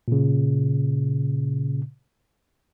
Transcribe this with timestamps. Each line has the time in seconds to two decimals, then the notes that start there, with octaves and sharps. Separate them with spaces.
0.08 A#2 C#3